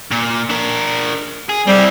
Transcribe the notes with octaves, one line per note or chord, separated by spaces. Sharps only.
A#2
D4 A#4
G#4
G3 C4 E4